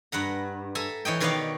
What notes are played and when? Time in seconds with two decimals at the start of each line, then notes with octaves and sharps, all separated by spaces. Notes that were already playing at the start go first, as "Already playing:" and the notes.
0.12 G2 B4 F#5 A#5
0.75 A4 E5 G#5 A#5
1.05 E3 C#5 D#5 G5
1.20 B2 D#3 B4 C#5 D5 F5